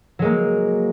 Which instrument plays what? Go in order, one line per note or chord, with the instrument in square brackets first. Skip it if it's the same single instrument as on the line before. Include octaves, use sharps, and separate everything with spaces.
[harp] F#3
G#3
A#3